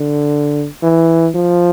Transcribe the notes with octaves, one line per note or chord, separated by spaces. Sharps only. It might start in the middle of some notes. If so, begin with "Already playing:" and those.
Already playing: D3
E3
F3